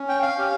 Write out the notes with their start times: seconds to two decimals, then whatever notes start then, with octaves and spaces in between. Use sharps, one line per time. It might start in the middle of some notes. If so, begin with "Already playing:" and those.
Already playing: C#4
0.09 G5
0.22 F5
0.37 C#4 G4